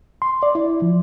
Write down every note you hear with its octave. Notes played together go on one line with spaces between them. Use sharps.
C6
D5
E4
F3